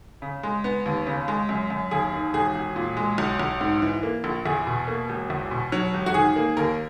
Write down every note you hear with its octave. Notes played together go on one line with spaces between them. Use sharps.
C#3
G#3
B3
D#2
C#3
G#3
F#2
F#2
D#2 G#4
D#3
E1 G#4
E1
A#2
G#3
B1
B1
G#2
E3
A#3
A#1
E2 G#4
B2
A#3
E1
E2
B2
F#3
E1
F#4
D#3 G#4
A#3
D#2 A#4